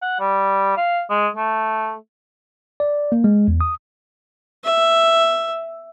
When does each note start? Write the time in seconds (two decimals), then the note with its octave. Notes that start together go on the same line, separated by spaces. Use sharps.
0.02 F#5
0.20 G3
0.77 F5
1.10 G#3
1.36 A3
2.80 D5
3.12 A#3
3.24 G#3
3.48 E2
3.61 D#6
4.64 E5